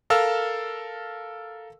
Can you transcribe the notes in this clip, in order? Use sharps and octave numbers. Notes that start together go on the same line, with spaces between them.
A4 A#4 F5 E6